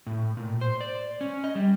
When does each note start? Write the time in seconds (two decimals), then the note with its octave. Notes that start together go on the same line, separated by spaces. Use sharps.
0.07 A2
0.37 A#2
0.61 C5
0.81 D5
1.21 C#4
1.44 D#5
1.55 G3